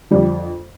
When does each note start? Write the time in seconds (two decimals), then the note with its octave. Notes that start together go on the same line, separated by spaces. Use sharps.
0.11 F2 D3 F3 G3